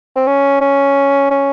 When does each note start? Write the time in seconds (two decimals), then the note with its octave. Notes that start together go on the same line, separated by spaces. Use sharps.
0.16 C4
0.27 C#4
0.61 C#4
1.31 C#4